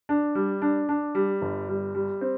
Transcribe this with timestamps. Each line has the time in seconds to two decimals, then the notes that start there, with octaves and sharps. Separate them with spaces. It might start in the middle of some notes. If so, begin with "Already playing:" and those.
0.09 D4
0.35 G3
0.62 D4
0.89 D4
1.15 G3
1.41 G1
1.68 G3
1.95 G3
2.21 C4